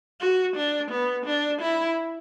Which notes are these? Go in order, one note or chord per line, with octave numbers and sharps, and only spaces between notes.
F#4
D4
B3
D4
E4